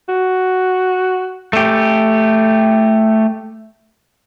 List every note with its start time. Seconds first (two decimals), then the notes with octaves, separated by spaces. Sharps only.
0.09 F#4
1.53 A3 G4